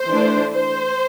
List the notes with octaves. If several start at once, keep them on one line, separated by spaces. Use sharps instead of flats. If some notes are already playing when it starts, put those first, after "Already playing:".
Already playing: C5
E3 A3 D4
C5